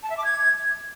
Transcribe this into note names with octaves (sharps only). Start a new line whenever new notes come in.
A5
E5
D6
G#6